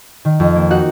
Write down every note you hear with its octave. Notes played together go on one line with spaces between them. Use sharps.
D#3
F2
A#3
D#4 F#4 F#5